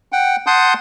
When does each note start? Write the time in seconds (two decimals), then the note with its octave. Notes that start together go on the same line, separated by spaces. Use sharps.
0.12 F#5 G5
0.47 F#5 A5 C6 D#6 G6